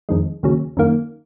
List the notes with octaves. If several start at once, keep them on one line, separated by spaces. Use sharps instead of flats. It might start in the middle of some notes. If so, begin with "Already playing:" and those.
F2 D#3 G#3
D#2 C#3 F#3
F#2 D#3 A#3